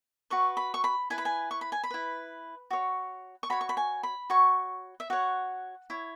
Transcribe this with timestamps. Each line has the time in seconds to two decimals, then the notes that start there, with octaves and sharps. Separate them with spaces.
0.30 F#4 B4 C#6
0.57 B5
0.74 C#6
0.84 B5
1.10 E4 B4 G#5
1.18 B5
1.25 G#5
1.51 C#6
1.61 B5
1.72 G#5
1.84 B5
1.91 E4 B4
2.71 F#4 C#5
3.43 C#6
3.50 F#4 C#5 B5
3.61 C#6
3.69 B5
3.77 G#5
4.03 B5
4.30 F#4 C#5 C#6
5.00 E5
5.10 F#4 C#5 F#5
5.90 E4 C#5